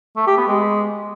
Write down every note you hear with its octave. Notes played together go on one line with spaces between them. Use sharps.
A3
G4
B3
G#3